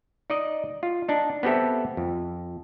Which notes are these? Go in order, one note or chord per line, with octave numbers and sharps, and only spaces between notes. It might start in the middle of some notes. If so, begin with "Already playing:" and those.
D#4 D5 D#5
F4
D4 D#4
B3 C4 G4 A4 E5
F2